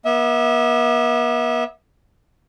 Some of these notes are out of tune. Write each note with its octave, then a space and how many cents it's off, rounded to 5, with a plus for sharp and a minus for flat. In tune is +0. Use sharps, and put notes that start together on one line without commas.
B3 -45 E5 -30